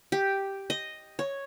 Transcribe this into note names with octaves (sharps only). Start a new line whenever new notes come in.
G4
D#5
C#5